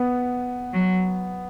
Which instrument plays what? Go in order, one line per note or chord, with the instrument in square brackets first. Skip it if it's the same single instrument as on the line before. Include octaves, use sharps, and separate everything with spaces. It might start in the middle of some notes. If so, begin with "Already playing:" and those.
Already playing: [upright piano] B3
[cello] F#3